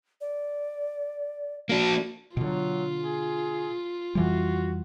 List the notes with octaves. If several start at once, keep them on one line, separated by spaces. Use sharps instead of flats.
D5
A#3 D4 F#4
B2 D3 F#3 F4
G#4
F2 E3 G3 F#4